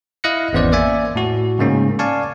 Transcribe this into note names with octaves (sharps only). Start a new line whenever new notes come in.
E4 D#5 F5 F#6 A#6 C#7
G#1 E2 B3 C#4 C5 D5
A#3 D5 E5 G#5
A2 F#4
G#2 C#3 A#3 C#4
D5 F5 G#5 A5 C#6